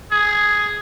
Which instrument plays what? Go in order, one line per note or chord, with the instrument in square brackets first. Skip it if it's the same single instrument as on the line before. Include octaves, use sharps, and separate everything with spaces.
[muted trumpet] G#4